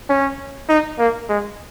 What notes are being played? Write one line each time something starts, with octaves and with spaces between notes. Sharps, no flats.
C#4
D#4
A#3
G#3